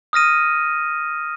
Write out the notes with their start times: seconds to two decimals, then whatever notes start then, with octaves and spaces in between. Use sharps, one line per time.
0.13 D#6 F6 A#6 D#7